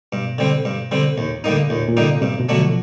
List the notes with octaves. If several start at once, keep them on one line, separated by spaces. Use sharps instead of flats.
G2 B2
D3 G3 C4
G2
D3 G3 C4
D#2 A#2
A2 D3 G3 A#3 D#4
D#2 A#2
A#2
D3 G3 A#3 D#4
C3
G2 C3
B2
D3 F#3 A3 D4
F3